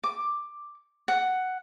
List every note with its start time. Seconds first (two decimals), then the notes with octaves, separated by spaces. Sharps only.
0.04 D6
1.08 F#5